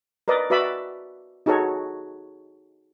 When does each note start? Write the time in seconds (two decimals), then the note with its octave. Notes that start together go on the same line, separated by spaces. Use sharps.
0.28 A#4 B4 D5 D#5
0.50 F#4 B4 D5 E5 B5
1.46 D#4 F#4 G#4 A4 C#5